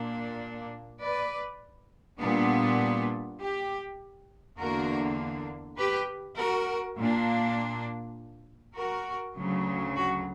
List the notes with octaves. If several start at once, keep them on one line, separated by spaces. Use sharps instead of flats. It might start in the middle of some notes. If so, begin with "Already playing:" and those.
Already playing: A#2 A#3 D4
B4 D5
A#2 G3 B3 D4
G4
E2 D3 A#3 D4 F#4 A#4
G4 B4
F#4 A#4
A#2 A#3 D4
F#4 A#4
D2 C#3 F#3
F#4